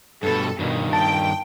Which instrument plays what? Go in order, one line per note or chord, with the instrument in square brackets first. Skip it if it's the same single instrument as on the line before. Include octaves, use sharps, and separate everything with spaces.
[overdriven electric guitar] G2 B2 [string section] A4
[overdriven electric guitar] G2 D#3 [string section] B2
[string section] G5 [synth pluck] A5